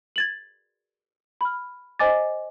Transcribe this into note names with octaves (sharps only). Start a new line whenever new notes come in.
G#6 A6 F#7
B5 F6
C5 D#5 G#5 D6 A6